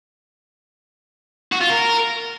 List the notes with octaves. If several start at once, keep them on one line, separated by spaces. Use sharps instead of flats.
F#4
F4
A#4